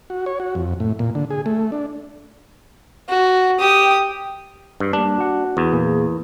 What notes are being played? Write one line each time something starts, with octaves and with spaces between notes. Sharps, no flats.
F#4
C#5
F#4
F2
A2
A#2
D3
G#4
A3
D4
F#4
G4 D#6
G2
G3 A#3 D4
F#4 F#5
E2
A#2 A#3 G#4